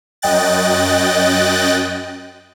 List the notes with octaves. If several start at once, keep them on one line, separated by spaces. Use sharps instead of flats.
F#2 D#5 G5 F#6 A6